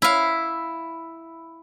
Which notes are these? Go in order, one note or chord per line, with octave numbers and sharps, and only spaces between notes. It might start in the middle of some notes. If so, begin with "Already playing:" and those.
E4 F5